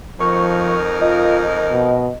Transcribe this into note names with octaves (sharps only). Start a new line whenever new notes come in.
F2 F3 D#4 A#4 C#6
F4 D#5
B2